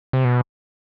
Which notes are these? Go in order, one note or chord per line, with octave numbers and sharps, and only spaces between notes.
C3
B2